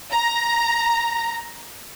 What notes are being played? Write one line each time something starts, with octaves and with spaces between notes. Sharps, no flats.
A#5